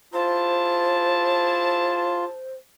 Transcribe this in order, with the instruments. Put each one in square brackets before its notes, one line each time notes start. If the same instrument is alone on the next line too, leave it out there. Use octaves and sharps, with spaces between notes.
[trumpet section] E4 G#4 A5 [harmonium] F4 [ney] C5